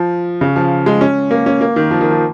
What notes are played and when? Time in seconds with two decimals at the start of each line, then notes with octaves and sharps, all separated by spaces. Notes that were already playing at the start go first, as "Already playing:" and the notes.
Already playing: F3
0.41 C#3
0.56 F3
0.86 G#3
1.01 C#4
1.31 A#3
1.46 C#4
1.61 A#3
1.76 D#3
1.91 F3
2.01 D#3
2.11 F3